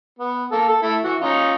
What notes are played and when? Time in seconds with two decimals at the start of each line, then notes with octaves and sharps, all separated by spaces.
0.18 B3
0.52 A#3 A4
0.68 A4
0.82 A3 E4
1.04 E3 F#4
1.21 C#4 D#4 F4